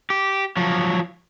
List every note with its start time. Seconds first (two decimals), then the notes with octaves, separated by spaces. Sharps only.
0.10 G4
0.57 F3 F#3